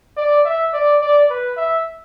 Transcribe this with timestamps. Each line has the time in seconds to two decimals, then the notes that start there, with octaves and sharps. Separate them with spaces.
0.17 D5
0.46 E5
0.73 D5
1.01 D5
1.30 B4
1.57 E5